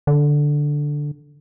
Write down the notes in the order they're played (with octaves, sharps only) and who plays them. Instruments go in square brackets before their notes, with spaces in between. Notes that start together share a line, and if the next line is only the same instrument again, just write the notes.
[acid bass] D3